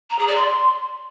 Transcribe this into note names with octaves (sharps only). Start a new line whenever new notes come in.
A#5
G#4
D5
C6